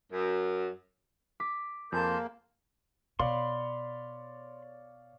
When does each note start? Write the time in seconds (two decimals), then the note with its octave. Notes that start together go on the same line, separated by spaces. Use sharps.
0.10 F#2
1.40 D6 B6
1.92 F2 A#3 G#4 A5 C6 G6 D7
3.20 B2 C#5 D5 F5 B5 C6